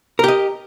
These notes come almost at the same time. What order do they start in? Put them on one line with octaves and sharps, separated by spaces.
A#4 G4 D#5